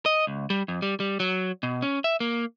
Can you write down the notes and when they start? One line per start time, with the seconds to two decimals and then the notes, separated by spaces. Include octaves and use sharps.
0.06 D#5
0.27 C#2
0.50 G3
0.68 F2
0.82 G3
1.00 G3
1.20 F#3
1.63 B2
1.82 C#4
2.04 E5
2.20 A#3